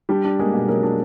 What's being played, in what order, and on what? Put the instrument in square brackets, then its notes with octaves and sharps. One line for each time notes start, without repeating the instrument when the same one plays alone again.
[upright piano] G3 D4 G4
D4
G#3 A#3 G#4
B2
F#3 A#3 A#4
D4